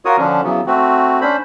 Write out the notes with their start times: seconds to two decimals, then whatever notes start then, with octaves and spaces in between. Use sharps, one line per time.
0.05 F4 F#4 A#4 C#5 D#6
0.18 D3 F3 C#4 D4
0.44 C#3 E3 F#3 B3
0.67 A3 C4 F#4
1.21 C#4 D4 C5 B5